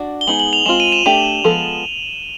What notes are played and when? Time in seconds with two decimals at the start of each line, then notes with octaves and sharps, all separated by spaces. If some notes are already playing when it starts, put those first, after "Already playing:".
Already playing: D4 F#4 D5
0.21 G7
0.27 G#3 B3 D#4 G#4 F#7
0.40 F#7
0.53 F7
0.66 G#3 C4 F4 E7
0.80 D#7
0.92 E7
1.06 A3 D4 G4 F7
1.44 F3 G#3 B3 A4